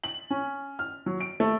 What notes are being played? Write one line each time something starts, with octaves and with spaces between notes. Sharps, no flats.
F#7
C#4
F6
F#3
D7
A3